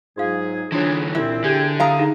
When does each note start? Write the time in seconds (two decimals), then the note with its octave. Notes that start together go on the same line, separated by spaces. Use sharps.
0.18 G#2 F#3 F4 G#4 F5
0.72 D3 E3 D4 F4 G#4 C#5
1.15 C2 A#2 C4 E4 E5
1.44 E2 D3 G4 G5 G#5
1.80 E4 F5 A#5 D#6
1.99 D#4 G#4